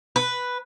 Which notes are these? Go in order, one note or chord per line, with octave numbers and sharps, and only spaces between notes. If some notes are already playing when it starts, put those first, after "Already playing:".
B4